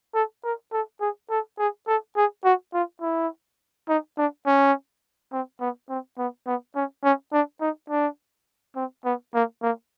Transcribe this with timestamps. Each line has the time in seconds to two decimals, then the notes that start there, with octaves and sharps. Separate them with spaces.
0.14 A4
0.44 A#4
0.72 A4
1.01 G#4
1.30 A4
1.59 G#4
1.87 A4
2.16 G#4
2.44 F#4
2.74 F4
3.01 E4
3.89 D#4
4.17 D4
4.46 C#4
5.32 C4
5.61 B3
5.90 C4
6.18 B3
6.47 B3
6.75 C#4
7.04 C#4
7.33 D4
7.61 D#4
7.90 D4
8.76 C4
9.05 B3
9.34 A#3
9.62 A#3